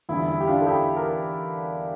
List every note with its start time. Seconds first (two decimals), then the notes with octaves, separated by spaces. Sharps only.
0.09 E2 D3 G3 E4
0.28 E4
0.41 G4
0.47 D4 F4
0.61 A4
0.66 E4 G4
0.96 G4 A#4